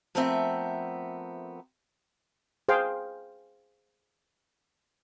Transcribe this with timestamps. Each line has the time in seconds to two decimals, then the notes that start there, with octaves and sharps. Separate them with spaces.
0.15 F3 A3 B3 C4 A#4 E5
2.68 G#4 C5 F5 G5